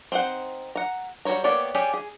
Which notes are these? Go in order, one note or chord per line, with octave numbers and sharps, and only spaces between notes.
C4 D#4 C5 F#5
F#5 A#5
G3 F#4 C5 C#5 A#5
A#3 B3 G4 C#5 D5
C#4 G4 G#4 D5
G#4